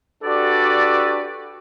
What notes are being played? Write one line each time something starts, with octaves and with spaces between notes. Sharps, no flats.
D4 F#4 G4 A4 B4 D5